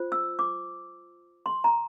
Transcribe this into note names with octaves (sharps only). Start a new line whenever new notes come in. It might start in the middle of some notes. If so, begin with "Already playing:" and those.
Already playing: F4 C5
E6
D6
C6
A#5